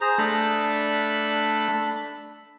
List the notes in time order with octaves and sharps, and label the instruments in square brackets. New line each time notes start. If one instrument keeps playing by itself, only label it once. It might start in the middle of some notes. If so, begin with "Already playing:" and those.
[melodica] G#4 C5 A#5
[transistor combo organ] A3 [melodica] D4 B5